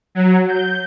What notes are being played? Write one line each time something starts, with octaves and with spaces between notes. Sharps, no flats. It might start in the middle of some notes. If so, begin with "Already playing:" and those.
F#3
G6